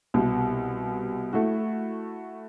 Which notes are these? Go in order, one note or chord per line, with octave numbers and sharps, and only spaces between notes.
C2 B2
A3 E4 F#4